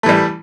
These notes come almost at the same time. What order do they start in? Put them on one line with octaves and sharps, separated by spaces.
A3 E3 G3